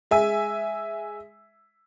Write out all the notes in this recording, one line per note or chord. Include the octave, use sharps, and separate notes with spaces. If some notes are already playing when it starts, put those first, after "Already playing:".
G#3 E5 G#5